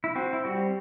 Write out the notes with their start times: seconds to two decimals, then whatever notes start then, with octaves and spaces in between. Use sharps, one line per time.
0.04 E4
0.15 C4 F#4
0.33 E4
0.45 G3 F#4